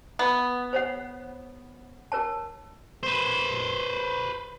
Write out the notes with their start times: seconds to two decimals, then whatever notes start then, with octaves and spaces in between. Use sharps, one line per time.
0.19 B3
0.73 C5 C#5 F#5
2.12 A#4 C#5 A5
3.03 B4 C5